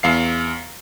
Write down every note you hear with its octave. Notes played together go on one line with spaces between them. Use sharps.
E2 F5 C7